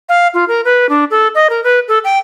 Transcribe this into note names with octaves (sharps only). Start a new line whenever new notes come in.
F5
F4
A#4
B4
D4
A4
D#5
A#4
B4
A4
G5